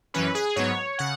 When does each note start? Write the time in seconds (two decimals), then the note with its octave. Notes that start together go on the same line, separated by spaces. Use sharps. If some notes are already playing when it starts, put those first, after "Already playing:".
0.14 F#2 E3 C#4 B4
0.35 G#4
0.56 G#2 F#3 B3 C#5
0.99 C#3 F#5